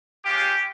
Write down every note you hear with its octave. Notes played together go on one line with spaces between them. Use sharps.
G#3 C#4 F4 G4